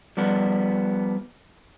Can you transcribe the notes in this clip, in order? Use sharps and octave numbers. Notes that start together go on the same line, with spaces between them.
F3 G3 B3